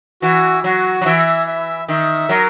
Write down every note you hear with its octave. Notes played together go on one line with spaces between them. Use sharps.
E3 F#4
F#3 F#4
F#3
E3 E5
E5
D#3 E5
F#3 A#4